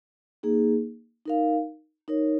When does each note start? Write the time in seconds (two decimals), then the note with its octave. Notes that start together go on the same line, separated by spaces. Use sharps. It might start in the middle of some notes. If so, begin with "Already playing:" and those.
0.43 A#3 D#4 G#4
1.26 D#4 A#4 F5
2.08 D#4 A#4 C#5